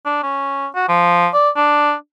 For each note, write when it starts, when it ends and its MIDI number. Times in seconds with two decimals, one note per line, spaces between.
0.05 0.22 62
0.23 0.67 61
0.75 0.88 66
0.89 1.28 53
1.33 1.49 74
1.56 1.93 62